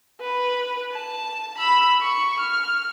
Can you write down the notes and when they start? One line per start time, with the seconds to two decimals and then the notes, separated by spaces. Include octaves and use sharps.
0.21 B4
0.92 A5
1.58 B5 E6
2.02 C#6
2.40 F6